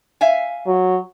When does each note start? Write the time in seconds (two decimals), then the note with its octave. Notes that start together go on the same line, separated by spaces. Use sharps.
0.21 E5 F5 G#5
0.67 F#3